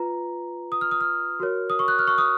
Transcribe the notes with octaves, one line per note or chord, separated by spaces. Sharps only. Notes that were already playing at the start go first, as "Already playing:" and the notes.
Already playing: F4 B4 A#5
D#6
F6
D#6
F6
F#4 A#4 C#5
D#6
C#6
F#6
F6
C#6
D#6